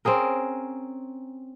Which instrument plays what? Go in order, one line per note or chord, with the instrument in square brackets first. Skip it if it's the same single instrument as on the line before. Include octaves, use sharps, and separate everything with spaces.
[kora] C4 C#4 G#4 A#4